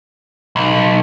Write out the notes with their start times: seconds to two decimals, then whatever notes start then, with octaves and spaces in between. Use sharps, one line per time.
0.56 B1